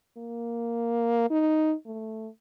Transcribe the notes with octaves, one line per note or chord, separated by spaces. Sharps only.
A#3
D#4
A3